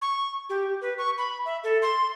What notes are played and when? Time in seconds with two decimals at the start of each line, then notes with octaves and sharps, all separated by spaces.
0.02 C#6
0.50 G4
0.81 B4
0.98 C#6
1.18 B5
1.45 E5
1.64 A4
1.82 C6